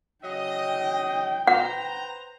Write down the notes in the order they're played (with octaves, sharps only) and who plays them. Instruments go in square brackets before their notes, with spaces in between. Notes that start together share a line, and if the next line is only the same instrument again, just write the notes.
[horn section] C#3 F#3 D#5 [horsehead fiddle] G5
[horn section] B4 C5 A#5 [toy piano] F#5